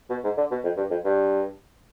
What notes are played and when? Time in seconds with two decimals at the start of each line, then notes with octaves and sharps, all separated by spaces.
0.10 B2
0.24 G#2
0.37 D3
0.51 B2
0.64 F2
0.77 G2
0.90 F2
1.05 G2